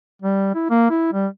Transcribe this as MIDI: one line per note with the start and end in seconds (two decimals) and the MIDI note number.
0.22 0.50 55
0.55 0.67 64
0.70 0.90 58
0.90 1.09 64
1.13 1.27 55